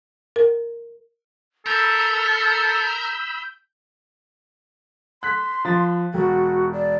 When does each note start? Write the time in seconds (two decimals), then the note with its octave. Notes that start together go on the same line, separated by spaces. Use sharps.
0.36 A#4
1.66 A4 A#4 B5 E6 G6
5.23 C6 F#6 B6
5.65 F3 A6
6.14 E1 F#4
6.73 D5